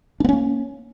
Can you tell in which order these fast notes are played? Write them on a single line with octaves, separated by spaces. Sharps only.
D4 B3 C#4 A#3